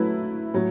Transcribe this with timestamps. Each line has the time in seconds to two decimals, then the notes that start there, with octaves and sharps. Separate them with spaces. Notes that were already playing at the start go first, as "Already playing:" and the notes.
Already playing: F#3 A3 E4 B4
0.54 A2 F#3